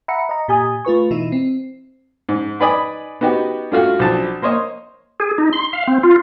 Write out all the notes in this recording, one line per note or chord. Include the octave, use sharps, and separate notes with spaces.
E5 F#5 A#5 B5 C#7
D#5 A#5
A#2 G4 G#5 D#6
A3 F4 B4 C#6
B2 E3 D#4 E4
C4
G#2
D#4 B4 D5 G#5 B5 D#6
B3 D#4 F#4 G4
G2 A3 F4 F#4 F6
B1 F3 D4 A5
A#3 C5 C#5 D#5
G#4
D#4
C6
F5
C4
F4